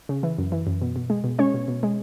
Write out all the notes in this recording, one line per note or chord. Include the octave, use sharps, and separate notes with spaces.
C#3
E3
F#2
E3
F#2
B2
B2
G#3
B2
G#3 C#4 C#5
B2
B2
G#3